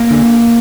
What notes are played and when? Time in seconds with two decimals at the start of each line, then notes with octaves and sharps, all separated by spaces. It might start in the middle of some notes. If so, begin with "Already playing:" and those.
Already playing: A#3
0.11 D3